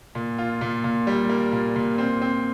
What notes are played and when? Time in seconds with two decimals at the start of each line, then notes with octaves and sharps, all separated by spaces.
0.15 A#2
0.38 F4
0.61 A#2
0.84 A#2
1.07 G3
1.29 A#3
1.52 A#2
1.76 A#2
1.98 C4
2.22 C4